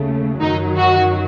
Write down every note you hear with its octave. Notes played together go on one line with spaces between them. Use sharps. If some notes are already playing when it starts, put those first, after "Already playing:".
Already playing: D#2 C#3 A3
F#2 D#3 F#3 D#4
F#4